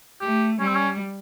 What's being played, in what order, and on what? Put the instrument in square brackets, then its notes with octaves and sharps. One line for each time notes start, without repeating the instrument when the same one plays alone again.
[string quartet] A3 [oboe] G4
[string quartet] G3 [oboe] C#4
[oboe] C4
C#4